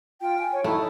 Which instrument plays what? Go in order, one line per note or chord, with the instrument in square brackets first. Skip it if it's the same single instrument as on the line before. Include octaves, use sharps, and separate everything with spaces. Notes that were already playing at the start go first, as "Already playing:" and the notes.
[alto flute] F4 [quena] G5
[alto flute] G#5
[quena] C#5
[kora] A3 [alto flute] D#4 [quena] E4